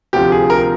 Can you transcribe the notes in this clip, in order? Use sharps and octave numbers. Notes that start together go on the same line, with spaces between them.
D2 C3 F3 G4
G#4
A#4